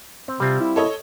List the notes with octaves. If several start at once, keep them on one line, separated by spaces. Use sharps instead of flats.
C4
C3 G3 C4 F4
E4
A4 C#5 D#5